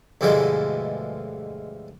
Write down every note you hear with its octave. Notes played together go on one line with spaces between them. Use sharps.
D2 G2 B2 E3 F3 G#3